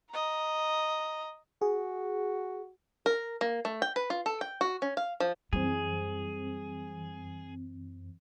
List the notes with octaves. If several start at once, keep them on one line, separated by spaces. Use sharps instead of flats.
D#5 A#5
F#4 G#4
A#4
A#3
A3
G5
B4
F4
A4
G5
F#4
C#4
F5
F3
F#2 E3 G3 C4 G#4